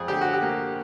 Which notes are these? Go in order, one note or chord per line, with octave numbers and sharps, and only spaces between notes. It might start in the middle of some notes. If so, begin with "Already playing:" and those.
Already playing: F2 G#4
D3 G4
F#4
G4
A#3